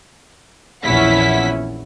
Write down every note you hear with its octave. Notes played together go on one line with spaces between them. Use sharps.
A#1 E2 C#4 E4 F#5 B6